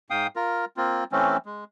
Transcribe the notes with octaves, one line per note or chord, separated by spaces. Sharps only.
G#2 F5 G5 D#6
F4 A#4
A#3 C4 F4
E3 A3 C4 C#4
G#3